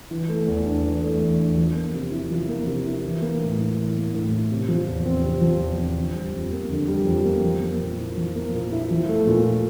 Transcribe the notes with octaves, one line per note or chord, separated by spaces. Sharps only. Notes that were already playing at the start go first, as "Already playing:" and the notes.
E3
A3
E2
D4
E3
A3
E2
D4
F3
A#3
C3
E4
F3
A#3
C3
E4
E3
A#3
A2
E4
E3
A#3
A2
E4
C3
F3
E2
C4
C3
F3
E2
C4
D3
G3
F2
A#3
D3
G3
F2
A#3
F3
A#3
A#2
E4
F3
A#3
A#2
E4
F3
A3
A#2
E4